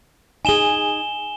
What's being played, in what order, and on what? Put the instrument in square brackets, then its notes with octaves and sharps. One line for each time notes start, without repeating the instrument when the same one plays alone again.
[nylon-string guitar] D#4 G#4 [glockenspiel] G#5 E7 G7